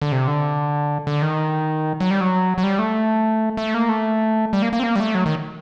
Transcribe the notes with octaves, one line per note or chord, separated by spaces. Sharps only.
D3
C3
D3
D3
D#3
F#3
G3
F#3
F#3
G3
A3
A3
A#3
A3
G3
A#3
A#3
C4
A#3
G3
A3
F#3
D#3